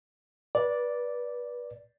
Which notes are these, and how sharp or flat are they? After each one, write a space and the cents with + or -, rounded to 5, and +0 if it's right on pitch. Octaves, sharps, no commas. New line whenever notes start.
B4 -25 D5 -5